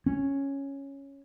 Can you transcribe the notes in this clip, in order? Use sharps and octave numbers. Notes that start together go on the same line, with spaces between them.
C#4